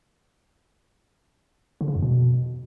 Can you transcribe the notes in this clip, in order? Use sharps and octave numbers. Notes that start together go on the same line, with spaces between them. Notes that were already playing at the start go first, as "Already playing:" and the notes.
D3
C#3
F2
B2